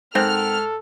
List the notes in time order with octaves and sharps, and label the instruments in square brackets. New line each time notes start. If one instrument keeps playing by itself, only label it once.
[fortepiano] G#2 F#6 [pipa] D#3 C4 F#5 [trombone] A4 [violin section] F6